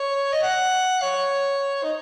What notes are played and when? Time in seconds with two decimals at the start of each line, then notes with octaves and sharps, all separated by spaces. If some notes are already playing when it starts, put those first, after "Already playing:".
Already playing: C#5
0.33 D#5
0.43 F#5
1.02 C#5
1.83 D#4